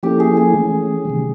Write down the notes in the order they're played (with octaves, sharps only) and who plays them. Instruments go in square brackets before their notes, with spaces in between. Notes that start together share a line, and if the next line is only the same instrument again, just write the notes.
[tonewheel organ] F3 A#3 C#4 E4 A4 [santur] G4
[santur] G#4
G#4
[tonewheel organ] E3 A3 C#4
C3 D#3 G3